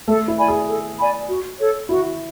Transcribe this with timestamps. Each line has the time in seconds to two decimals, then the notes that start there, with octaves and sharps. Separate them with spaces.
0.08 A3 A4
0.28 E4
0.38 D5 G#5 B5
0.48 G#4
0.68 A4
0.99 D5 G#5 B5
1.29 F#4
1.59 A4 C#5
1.89 E4 F#4